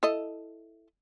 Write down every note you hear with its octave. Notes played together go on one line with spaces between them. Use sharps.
E4 A4 D#5